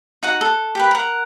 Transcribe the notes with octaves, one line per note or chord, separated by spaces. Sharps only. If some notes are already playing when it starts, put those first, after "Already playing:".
D#4 F#4 F#5
A4
G4 A#4 B4
A#4 F#5